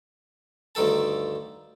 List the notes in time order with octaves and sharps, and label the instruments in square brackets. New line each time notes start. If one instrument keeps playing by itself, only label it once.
[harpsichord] D2 G2 D#3 A4 A5